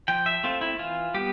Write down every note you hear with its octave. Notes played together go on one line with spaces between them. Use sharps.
F3 G5
E5
A3 C4 F4
E4
E3 F4
G3 B3 G4